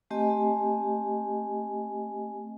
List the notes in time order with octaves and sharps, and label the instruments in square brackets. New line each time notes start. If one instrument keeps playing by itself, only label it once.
[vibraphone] A3 C4 G4 D#5 G#5